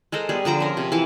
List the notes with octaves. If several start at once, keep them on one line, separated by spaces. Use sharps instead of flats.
G#3 A4 A#4 C5
G3 B3 G#4
D3 F3 A#5 D6
C#4 A#4
C3
E3 E4 F5